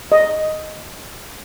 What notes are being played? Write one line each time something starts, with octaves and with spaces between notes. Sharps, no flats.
D#5